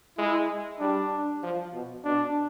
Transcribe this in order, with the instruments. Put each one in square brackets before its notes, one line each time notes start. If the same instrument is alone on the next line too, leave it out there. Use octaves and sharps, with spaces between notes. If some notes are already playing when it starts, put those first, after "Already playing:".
[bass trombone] G#3 [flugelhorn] E4
[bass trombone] G3 [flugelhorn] D4
[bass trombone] F3
B2
[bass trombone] B2 [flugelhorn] D4